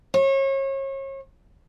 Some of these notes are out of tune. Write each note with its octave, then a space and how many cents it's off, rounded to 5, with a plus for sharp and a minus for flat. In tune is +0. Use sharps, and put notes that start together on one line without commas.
C#5 -35